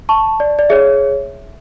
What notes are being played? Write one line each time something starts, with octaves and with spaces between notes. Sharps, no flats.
A5 C#6
D5
D5
G#4 C#5 E5